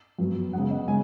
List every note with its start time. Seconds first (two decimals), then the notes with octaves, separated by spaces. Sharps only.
0.19 F#2 F#3 B3
0.53 C#3 G#3 B3 F#5
0.71 D#5
0.88 C#3 G#3 B3 G#5